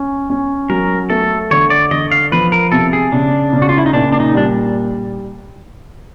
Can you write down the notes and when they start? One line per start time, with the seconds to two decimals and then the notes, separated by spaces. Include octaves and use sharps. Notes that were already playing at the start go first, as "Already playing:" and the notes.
Already playing: C#4
0.30 C#4
0.69 F#3 A#4
1.10 A3 A4
1.51 D3 C#5
1.70 D5
1.91 D3 D#5
2.11 F5
2.32 F3 B4
2.52 A#4
2.72 C3 A4
2.93 G#4
3.12 C#3 D4
3.53 C#3
3.62 F#4
3.69 F4
3.78 E4
3.86 D#4
3.94 A#2 D4
4.12 D4
4.20 D#4
4.34 G3 D4